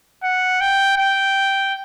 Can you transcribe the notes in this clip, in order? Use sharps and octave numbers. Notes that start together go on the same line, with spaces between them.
F#5
G5
G5